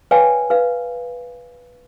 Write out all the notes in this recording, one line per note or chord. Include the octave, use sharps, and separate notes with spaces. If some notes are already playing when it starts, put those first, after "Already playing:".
B4 C#5 D5 F5 G5 G#5
B4 F5